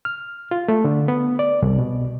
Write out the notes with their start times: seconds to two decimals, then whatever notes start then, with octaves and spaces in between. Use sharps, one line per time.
0.05 F6
0.51 F4
0.68 A3
0.85 D3
1.08 B3
1.39 D5
1.62 C2
1.79 B2